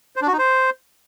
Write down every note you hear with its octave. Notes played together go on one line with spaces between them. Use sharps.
C5
D4
F#4
D#4
C5